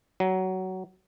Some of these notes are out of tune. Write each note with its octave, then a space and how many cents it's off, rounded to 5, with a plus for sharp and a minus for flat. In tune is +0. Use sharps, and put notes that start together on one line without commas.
F#3 +15